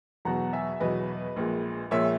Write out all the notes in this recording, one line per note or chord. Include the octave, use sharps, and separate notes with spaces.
E2 B2 F#3 F#5 A#5
E5 G#5
E2 B2 F#3 B4 D#5
A#1 A#2 G#3
A#1 A#2 G#3 C#5 E5